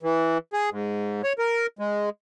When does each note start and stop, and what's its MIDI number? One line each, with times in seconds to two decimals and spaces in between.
0.03 0.38 52
0.53 0.70 68
0.71 1.22 44
1.24 1.33 73
1.39 1.66 70
1.79 2.09 56